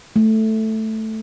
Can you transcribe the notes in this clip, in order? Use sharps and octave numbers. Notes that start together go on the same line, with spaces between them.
A3